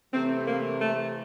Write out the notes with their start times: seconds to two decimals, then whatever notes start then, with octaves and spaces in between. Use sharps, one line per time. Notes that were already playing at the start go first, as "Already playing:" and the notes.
0.13 C3 E3 A3 C4
0.46 A#3
0.81 A3